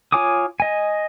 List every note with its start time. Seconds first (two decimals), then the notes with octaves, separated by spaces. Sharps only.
0.12 F4 C#5 G#5 D6 D#6
0.60 D#5 G#5